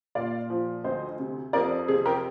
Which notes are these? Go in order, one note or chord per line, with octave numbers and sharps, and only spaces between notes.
A#2 D5 F5
F3
D2 C5 D#5
C3
F2 A#4 D5
C3 G#4
G4 A#4